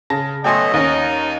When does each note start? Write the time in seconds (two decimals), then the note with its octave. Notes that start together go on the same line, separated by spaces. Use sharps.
0.10 C#3 A5 A#6
0.44 B2 F#3 A3 D#5 G5 G#5 C6
0.73 D#2 C#4 D#4